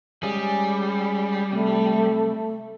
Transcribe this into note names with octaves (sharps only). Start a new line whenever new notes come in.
G3 G#3 C#4 G#4
C3 A3